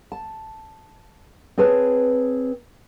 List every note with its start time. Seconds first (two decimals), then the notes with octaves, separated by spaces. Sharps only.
0.12 A5
1.58 C4 G#4 B4 C#5 A5